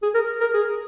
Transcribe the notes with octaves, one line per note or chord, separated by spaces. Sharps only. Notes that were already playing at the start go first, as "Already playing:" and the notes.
G#4
A#4
A#4
G#4